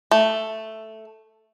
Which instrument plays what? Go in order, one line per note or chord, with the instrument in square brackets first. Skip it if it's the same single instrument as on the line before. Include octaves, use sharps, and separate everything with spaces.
[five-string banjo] A3